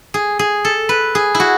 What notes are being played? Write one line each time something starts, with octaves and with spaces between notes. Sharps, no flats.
G#4
G#4
A4
B4
G#4
E4
F#4